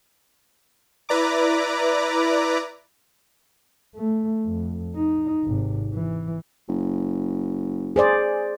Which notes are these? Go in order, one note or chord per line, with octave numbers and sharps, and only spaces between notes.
E4 B4 D5 A#5 D6
A3
F2
D#4
G#1 C3
E3
F#1
G#4 C5 D5